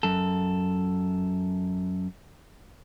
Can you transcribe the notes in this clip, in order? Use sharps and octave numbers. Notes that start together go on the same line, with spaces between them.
F#2 A4